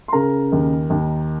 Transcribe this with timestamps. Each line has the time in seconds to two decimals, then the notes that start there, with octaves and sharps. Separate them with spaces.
0.08 C6
0.12 C#3 A#4 A#5
0.52 D#2
0.90 D#2